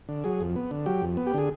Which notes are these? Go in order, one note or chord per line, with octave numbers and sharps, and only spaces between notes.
D3
F#3 G#4
F2
B3
D3
F#3 G4
F2
B3
G4
D3 G#4